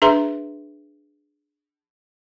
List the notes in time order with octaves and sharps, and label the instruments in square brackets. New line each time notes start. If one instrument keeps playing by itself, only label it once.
[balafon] D4 G#4 B4 E5 A#5 C6